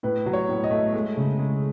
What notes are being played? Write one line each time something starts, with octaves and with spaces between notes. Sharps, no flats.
A2 B4
F#3
C#5
A2
D#5
A3
G#3
C#3
G#3